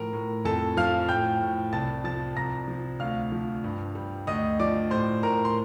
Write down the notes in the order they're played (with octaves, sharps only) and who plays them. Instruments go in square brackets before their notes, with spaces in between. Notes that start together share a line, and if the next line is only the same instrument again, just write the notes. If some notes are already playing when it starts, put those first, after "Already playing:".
Already playing: [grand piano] A2 F3 A#4 A#5
A2
F2 A4 A5
F3 F5 F6
A2 G5 G6
A2
C2 A5 A6
F3 A5 A6
C2 A#5 A#6
F3
D2 F5 F6
F3
G2
G3
D2 D#5 D#6
F3 D5 D6
A2 C5 C6
A2 A#4 A#5
C6